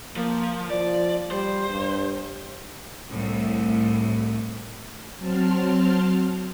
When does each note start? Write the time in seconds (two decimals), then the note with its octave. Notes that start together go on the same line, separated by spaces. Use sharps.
0.16 F3 A#3
0.70 F3 D5
1.31 G3 C5
1.69 G2
3.10 C2 A2
5.19 F#3 C4 A5 C6 F6